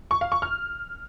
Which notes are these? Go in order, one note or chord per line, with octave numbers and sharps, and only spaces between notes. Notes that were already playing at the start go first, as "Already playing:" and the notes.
C#6
F5
C#6
F6